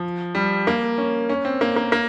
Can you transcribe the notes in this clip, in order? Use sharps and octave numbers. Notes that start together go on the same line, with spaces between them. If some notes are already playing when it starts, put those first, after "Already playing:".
Already playing: F3
G3
A#3
C#4
C#4
C4
A#3
A#3
A#3